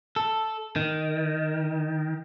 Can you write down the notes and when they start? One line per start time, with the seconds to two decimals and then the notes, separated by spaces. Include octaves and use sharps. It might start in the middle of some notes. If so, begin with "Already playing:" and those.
0.16 A4
0.76 D#3